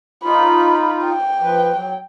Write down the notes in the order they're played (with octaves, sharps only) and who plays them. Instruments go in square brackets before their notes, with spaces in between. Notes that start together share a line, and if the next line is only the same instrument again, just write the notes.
[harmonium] D#4 F4 [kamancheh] B5
[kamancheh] G5
[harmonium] F3 B4
F#3